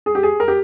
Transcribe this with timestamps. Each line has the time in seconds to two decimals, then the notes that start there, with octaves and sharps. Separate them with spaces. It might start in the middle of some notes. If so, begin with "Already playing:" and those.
0.06 G#4
0.15 G4
0.23 G#4
0.40 A#4
0.48 G4